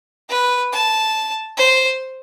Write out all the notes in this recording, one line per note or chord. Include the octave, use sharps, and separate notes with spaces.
B4
A5
C5